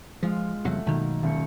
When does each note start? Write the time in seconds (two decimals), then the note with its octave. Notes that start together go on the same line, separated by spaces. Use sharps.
0.23 F3 G#3 F4 F6
0.65 E2 C3 F#3 A3 F#5
0.86 B1 B2 D#3 A#3
1.23 D#1 C#7